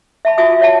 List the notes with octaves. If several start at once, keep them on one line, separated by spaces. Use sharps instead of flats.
E5 A5 B5
F4 F#4 E5 G#5 D#6
C#5 E5 F#5 A5